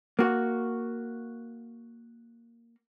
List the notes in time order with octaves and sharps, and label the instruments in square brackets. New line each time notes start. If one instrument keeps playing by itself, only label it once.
[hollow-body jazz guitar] A#3 F#4